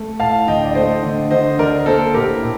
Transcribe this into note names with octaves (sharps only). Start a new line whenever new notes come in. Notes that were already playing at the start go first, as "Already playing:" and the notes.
Already playing: A3
A2 F5 A5
D3 D#5 G5
D5
A3 C5 D#5
D3
D3 C5 D#5
D3 A#4 D5
A#3 A4 C5
A2 G4 A#4
A2